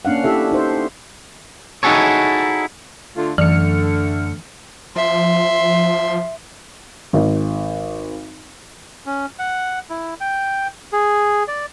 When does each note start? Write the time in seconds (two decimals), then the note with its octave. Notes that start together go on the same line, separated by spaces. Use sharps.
0.05 A#3 C#4 D4 F5 F#5
0.24 E4 G4 A4 E5
0.52 D#4 C5
1.83 D#4 E4 F#4 G#4 A4 C#5
3.16 D3 A3 F4
3.38 F#2 D3 E3 A3 F6 C#7
4.96 F3 E5 C6
7.13 G#1
9.06 C#4
9.39 F#5
9.90 E4
10.20 G5
10.93 G#4
11.48 D5